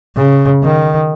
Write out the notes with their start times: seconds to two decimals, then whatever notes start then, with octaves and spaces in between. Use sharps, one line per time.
0.17 C#3
0.63 D#3